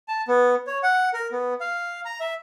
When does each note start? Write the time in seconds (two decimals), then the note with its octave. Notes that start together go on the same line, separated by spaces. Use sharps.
0.08 A5
0.28 B3
0.67 C#5
0.83 F#5
1.14 A#4
1.32 B3
1.61 F5
2.05 A#5
2.20 E5